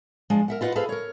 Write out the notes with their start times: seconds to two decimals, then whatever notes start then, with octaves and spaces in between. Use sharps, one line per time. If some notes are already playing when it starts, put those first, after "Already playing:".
0.30 F3 G#3 D4
0.48 A#4 E5 F#5
0.61 E4 F4 B4 D#5 F#5
0.75 G#4 A4 B4 C5 E5 F5
0.89 A#4 C#5